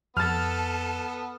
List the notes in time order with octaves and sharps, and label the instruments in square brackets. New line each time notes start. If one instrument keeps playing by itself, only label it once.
[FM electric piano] F2 [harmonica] B3 [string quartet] A4 [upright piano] F6 A6